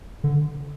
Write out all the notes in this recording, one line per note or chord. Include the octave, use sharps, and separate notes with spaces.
D3